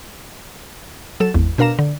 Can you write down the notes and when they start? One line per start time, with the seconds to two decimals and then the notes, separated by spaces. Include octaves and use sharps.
1.20 F#3 A4 E7
1.34 G#1 E2
1.58 B2 D4 A#4 F5 A#5 E7
1.79 D3